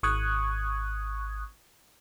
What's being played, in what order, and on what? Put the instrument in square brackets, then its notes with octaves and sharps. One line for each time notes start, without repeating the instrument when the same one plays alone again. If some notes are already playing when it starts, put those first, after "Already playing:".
[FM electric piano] G#1 C#6 D#6 F#6 G#6